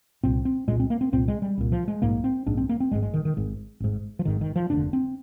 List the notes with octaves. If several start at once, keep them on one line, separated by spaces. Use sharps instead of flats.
C2 A#2 C4
C4
C2 A#2 G#3
C4
A#3
C4
C2 A#2 C4
G#3
G3
C2 A#2
F3
G#3
A#1 G#2 A#3
C4
A#1 G#2 D4
C4
A#3
C4
G#1 G#2 G#3
G#3
D#3
D#3
G#1 G#2
G#1 G#2
F3
G#1 G#2 D#3
D#3
F3
F1 D#2 D3 D4
C4